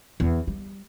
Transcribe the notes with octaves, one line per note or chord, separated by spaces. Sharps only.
E2
G3